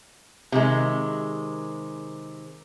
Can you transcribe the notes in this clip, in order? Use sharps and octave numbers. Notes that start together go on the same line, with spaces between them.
C3 D#3 G#3